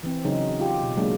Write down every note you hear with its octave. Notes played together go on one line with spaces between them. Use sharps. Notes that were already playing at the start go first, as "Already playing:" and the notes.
E3 C4
C#3 F#3 C#4 D#4
F4 G4
B2
F#3 G#3 A#3 D4